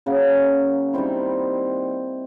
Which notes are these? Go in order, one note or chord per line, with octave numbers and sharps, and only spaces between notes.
C#3 F#3 A#3 C#4
D#3 G3 C4 E4